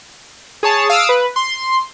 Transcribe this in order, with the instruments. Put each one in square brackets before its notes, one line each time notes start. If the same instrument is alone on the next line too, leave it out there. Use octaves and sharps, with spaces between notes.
[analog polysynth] G#4 C#5 A5
F5 D#6 E6 D7
B4
C6